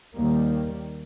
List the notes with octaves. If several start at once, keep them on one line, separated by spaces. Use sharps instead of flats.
D#2 D#3 G3 A#3